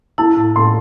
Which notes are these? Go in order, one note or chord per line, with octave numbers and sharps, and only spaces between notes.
E4 A5
A2
A2 C6